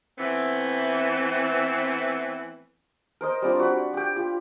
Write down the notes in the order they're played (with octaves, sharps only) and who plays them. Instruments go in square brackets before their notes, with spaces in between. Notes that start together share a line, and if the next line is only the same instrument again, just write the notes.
[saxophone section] E3 A3 B3 C4
[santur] A#4 C5 D#5
G3 C4 D4 F4
F#4 B5
G4 G5
F4 G4